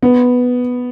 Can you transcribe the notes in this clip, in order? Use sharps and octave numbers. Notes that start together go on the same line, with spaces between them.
B3